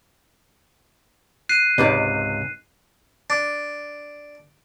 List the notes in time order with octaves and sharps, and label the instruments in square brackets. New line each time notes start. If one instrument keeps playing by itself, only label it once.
[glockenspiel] F#6 C7 D#7
[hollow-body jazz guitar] C#2 G#2 C3 [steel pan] D#4 B4 D5
[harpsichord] D4